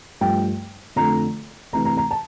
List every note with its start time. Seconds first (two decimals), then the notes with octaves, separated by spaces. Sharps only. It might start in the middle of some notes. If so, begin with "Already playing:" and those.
0.21 G2 F3 A3 G5
0.96 F2 D3 A3 A#5
1.73 D2 C3 E3 A3 A#5
1.85 A#5
1.97 A#5
2.11 A5